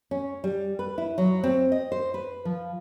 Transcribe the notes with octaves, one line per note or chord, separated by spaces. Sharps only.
C#4
G3
B4
E4
F#3
C4
D#5
C5
B4
F3